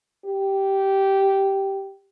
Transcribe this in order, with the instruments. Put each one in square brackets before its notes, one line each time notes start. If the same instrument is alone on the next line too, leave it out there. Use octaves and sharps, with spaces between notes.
[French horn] G4